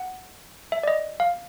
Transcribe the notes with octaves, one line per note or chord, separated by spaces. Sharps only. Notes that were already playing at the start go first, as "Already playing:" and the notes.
Already playing: F#5
E5
D5
D#5
F5